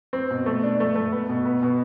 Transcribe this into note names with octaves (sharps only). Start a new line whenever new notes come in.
C4
B2
A3
D4
A3
A3
B3
B2
B3
B2